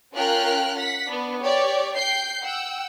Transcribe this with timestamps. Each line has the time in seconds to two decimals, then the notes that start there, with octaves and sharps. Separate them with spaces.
0.13 C#4 F4 A#4 G5 F6 F#6
0.77 F#5 B6
1.07 B3 D4
1.41 G4 C#5 D5
1.94 G5 G6 C7
2.42 F#5 G5 E6